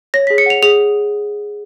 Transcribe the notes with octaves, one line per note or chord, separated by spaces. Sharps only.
C#5 A#6
G#4 B6
C#7
F#5 F7
G#4 F7